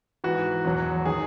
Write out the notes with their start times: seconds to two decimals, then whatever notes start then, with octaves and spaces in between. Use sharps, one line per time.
0.24 G#2 E3 F#4
0.64 E2 B2 F#3
1.05 D#3 F#3 G#4